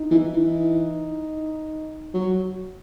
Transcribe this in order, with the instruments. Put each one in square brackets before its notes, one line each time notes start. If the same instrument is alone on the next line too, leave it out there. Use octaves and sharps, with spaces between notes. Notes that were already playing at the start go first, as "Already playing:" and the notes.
Already playing: [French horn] D#4
[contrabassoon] E3
[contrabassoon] E3 [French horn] D#4
[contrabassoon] F#3